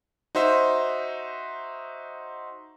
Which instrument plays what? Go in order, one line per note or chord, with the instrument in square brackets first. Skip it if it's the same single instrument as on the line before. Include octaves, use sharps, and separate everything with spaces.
[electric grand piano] D#4 F#4 C5 E5